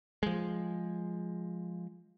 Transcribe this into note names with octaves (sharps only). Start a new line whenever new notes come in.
F3 G#3